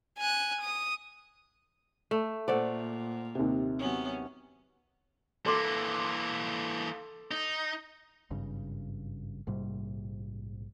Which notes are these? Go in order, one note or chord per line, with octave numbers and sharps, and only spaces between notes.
G#5 F#6
D#6
A3
A#2 A3 C5 D5 F#5
D#2 C3
F#3 B3 C#4
E3 A#3 A4 C6 D6
D#4
G#1 G2 C#3
A#1 G#2 C3 G3